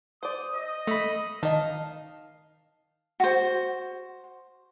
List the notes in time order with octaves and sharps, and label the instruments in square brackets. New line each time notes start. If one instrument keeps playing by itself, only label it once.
[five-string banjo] C5 D5 [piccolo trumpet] D#6
[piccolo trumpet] D#5
[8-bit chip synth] A3 B5
[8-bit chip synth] D#3 [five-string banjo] D#5 A5 [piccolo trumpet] F5
[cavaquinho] F#4 C5